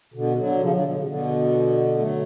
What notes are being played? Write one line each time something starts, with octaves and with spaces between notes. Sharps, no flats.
B2 D3
D3 F#3
C#3 F3
D3 F#3
B2
C#3
B2 D3
F#3 A3